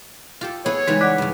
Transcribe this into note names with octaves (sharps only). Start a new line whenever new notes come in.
F4 G4 A4
B3 E4 G#4 C#5
C#3 E3 G3 G#3 D#4
D5 F#5 D6 F#6 B6
G2 C#3